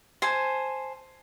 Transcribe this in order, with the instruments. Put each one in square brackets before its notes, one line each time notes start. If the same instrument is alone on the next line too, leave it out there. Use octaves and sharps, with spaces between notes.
[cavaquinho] C5 G#5 A5